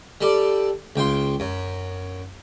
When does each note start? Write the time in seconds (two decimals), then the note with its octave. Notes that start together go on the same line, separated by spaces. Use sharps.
0.21 G3 A4 D5
0.96 C#2 G5 C6
1.40 F#2